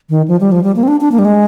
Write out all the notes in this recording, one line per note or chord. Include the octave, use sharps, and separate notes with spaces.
D#3
F3
G3
F3
G3
A#3
C4
D4
D4
A#3
G3
G#3